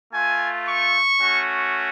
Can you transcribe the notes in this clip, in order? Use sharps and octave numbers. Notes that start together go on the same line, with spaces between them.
A3 F4 G#5
C#6
A3 C#4 F#4